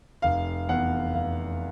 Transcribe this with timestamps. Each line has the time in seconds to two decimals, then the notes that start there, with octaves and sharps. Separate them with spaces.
0.22 F1 F5
0.69 E2 F#5
1.14 F1 F5